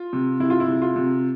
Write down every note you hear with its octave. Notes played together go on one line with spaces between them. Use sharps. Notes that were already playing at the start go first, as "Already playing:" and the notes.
Already playing: F4
C3
C3 E4
F4
E4
C3
F4
C3